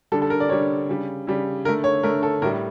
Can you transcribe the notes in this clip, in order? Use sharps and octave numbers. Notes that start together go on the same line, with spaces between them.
D3 G3 A4
A4
A#4
D5
D3 G3 C#5
C#3 G3
C#3 G3
D3 A3 A#4
C#5
D3 A3 A#4
A4
A2 G3 A#4